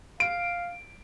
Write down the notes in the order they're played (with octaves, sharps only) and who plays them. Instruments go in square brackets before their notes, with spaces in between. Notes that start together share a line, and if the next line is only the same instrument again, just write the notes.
[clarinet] F5 [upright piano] D7